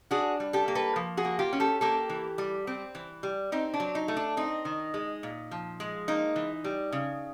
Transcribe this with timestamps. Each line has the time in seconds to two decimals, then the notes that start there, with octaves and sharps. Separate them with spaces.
0.11 D4 F#4 G#4
0.40 G3
0.53 G4 A4
0.68 A#3
0.75 A4 B4
0.96 F3
1.17 F#4 G#4
1.25 A#3
1.39 F4 G4
1.53 C#4
1.60 G4 A4
1.81 A#3 G4 A4
2.09 E3
2.38 G3
2.67 C4
2.95 E3
3.23 G3
3.52 C4 D#4
3.74 D4
3.80 F#3
3.95 D#4
4.08 A3
4.17 D4
4.37 C4 D#4
4.65 D#3
4.94 G#3
5.23 A#2
5.51 F3
5.80 G#3
6.08 A#3 D#4
6.36 E3
6.64 G3
6.92 C#3